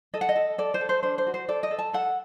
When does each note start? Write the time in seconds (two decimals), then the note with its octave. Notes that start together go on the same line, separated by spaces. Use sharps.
0.14 A4 D#5
0.21 F#5
0.29 D#5
0.36 A4
0.58 A4 D5
0.74 C5
0.81 A4
0.89 C5
1.03 D4 C5
1.18 C5
1.27 F#4
1.34 C5
1.48 A4 D5
1.63 D#5
1.71 A4
1.79 A5
1.93 A4 F#5